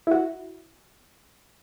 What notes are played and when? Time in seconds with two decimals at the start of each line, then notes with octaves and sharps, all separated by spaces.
0.07 E4 F#4